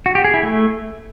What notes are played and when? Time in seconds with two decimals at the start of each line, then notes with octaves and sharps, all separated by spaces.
0.06 F#4
0.15 G4
0.24 G#4
0.34 E4
0.43 A3